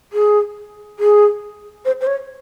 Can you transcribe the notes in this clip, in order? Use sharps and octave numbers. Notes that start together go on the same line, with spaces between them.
G#4
G#4
C5
C5
C#5